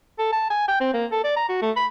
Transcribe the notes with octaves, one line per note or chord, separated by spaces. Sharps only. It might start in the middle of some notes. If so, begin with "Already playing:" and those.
A4
A5
G#5
G5
C4
A#3
A4
D5
A#5
F#4
A3
B5